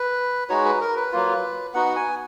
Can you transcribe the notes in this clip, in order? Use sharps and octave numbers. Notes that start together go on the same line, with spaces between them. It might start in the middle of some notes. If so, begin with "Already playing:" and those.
Already playing: B4
G#3 D#4 F#4 C#5
B4
A#4
B4
F#3 A#3 F4
B3 D#4 F#4 F#5
G#5